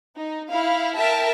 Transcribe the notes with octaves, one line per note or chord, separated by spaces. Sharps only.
D#4
E4 F5
A#4 E5 G5 A5